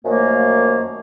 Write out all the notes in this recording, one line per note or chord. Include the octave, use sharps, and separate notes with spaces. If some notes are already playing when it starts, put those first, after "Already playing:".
F#2 D#3 F3 A3 A#3